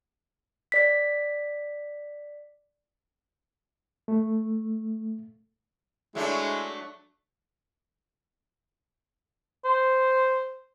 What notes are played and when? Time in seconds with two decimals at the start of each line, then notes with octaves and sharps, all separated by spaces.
0.72 D5 B6
4.08 A3
6.15 F#3 G#3 A3 D4 E4
9.65 C5